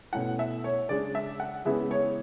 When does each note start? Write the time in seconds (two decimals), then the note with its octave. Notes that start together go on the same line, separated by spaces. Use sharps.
0.13 B2 A3 C#4 E4 F#5
0.39 E5
0.64 C#5
0.89 C#3 G#3 D4 D5
1.15 E5
1.40 F#5
1.65 C#3 E3 G#3 B3 E4 E5
1.91 C#5